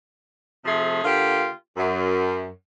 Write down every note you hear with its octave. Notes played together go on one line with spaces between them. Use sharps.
C3 F3 A3 G#4
D3 A#3 F4 G4
F#2